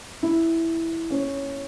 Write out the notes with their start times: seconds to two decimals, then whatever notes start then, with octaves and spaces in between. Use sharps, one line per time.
0.23 E4
1.10 C#4